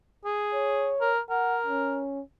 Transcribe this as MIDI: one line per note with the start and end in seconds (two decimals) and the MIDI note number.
0.25 0.95 68
0.54 1.12 73
1.01 1.19 70
1.30 2.02 70
1.30 1.58 78
1.66 2.22 61